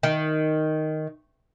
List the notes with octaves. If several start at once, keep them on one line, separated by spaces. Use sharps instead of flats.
D#3